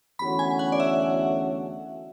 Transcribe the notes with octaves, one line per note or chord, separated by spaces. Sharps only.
E2 D3 A3 C#4 F#4 B5
G#5
F#5
D5
E5